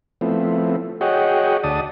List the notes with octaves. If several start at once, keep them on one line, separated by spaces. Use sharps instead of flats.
F3 A3 B3 C4 E4
F#4 G#4 C#5 D#5 F#5 G5
D2 D5 A5 D#6